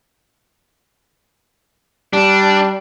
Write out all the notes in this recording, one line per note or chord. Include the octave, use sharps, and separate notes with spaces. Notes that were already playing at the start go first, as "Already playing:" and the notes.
G3 D4